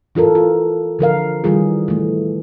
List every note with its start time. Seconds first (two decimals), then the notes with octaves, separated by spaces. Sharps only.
0.15 E3 F4 A4 A#4
0.35 F4
0.99 D3 F3 A#4 F5
1.44 D#3 E3 G3 F4 G#4
1.88 E3 A3